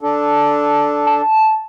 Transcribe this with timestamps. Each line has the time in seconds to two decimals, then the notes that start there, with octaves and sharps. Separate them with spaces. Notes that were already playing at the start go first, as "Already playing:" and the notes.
0.01 D4 A4
1.07 A5